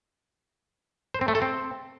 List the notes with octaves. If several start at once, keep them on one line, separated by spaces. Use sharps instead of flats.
C5
C4
A3
A4
C4